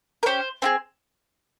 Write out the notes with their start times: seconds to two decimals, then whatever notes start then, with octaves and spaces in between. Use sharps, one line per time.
0.23 A#4
0.26 C#4 G4 C5
0.62 C4 F4 G#4